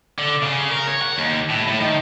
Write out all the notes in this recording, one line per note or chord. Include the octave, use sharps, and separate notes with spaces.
D3
C#3
A#4
C#5
F#5
D#2
A2
A2
D#3